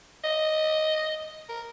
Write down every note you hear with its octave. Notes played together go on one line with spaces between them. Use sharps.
D#5
A#4